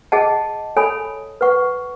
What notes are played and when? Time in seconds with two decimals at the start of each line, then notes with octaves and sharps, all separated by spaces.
0.12 G#4 D#5 F#5 A5
0.77 A4 C#5 G#5 B5
1.41 B4 F#5 C#6